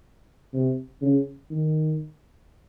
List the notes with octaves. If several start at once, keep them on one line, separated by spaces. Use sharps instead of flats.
C3
C#3
D#3